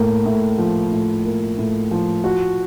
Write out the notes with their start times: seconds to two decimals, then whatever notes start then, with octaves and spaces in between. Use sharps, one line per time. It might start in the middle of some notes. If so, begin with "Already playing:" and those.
Already playing: A2 A#3
0.26 A2
0.58 F3
0.92 A2
1.25 A#3
1.58 A2
1.91 F3
2.24 F#4